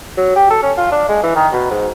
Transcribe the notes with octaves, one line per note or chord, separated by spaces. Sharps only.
F#3
G4
A4
C#4
F4
D4
G#3
E3
D#3
B2
G#2